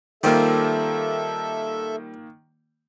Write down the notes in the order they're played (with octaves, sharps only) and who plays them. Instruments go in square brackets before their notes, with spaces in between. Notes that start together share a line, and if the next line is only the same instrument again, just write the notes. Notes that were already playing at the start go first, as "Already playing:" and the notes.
[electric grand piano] D#3 A#3 [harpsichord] G3 C4 F4 [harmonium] A4 E5